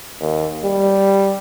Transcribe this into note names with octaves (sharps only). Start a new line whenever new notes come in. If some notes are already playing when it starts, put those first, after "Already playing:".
D#2
G3